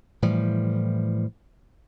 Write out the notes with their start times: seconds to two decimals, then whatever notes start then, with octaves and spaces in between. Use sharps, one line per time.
0.22 A2 E3 F3 G3